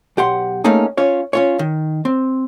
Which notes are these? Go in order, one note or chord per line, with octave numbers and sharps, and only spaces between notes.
B1 G4 F#5 C6
A3 A#3 C#4 D#4 G#4
C#4 F4 C#5
C#4 F4 C#5
D#3
C4